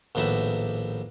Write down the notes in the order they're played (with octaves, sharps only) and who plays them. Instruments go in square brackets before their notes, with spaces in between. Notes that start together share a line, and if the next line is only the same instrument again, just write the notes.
[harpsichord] A#1 D#2 A2 B3 D#4 E5